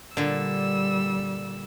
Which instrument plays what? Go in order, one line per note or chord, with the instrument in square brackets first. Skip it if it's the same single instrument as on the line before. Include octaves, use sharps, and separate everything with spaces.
[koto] A#2 D3 [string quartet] G3 E6